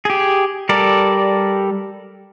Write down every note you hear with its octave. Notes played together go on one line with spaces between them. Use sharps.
G4 G#4
G3 A4 A#4 D5